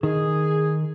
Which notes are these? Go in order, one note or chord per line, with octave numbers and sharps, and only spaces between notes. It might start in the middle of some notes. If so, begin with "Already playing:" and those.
D#3 G#4